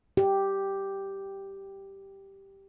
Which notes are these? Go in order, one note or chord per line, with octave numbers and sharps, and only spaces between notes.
G4